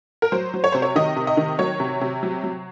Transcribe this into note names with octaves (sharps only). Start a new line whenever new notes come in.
A#4
F#3 C5
F#3
C#5
C3 C5
C#5
D#3 D#5
C3
D#5
D#3
F#3 C#5
C3
C3
F#3
F#3